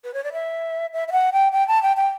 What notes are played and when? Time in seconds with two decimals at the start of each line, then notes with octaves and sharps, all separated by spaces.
0.04 B4
0.14 C#5
0.24 D5
0.33 E5
0.93 E5
1.08 E5
1.12 F#5
1.33 G5
1.53 G5
1.68 A5
1.83 G5
1.97 G5